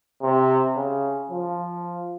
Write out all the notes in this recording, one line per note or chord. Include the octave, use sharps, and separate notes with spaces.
C3
C#3
F3